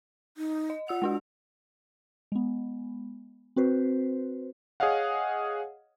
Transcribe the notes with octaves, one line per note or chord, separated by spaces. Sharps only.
D#4
D#5
F4 F#5 E6 F7
G#3 D4 F#4
G#3 B3
C4 F#4 B4 C5
G#4 C#5 D#5 F5 F#5